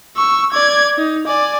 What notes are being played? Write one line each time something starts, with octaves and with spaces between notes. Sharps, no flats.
C#6 E6
D5 G#6
D#4
D5 G#5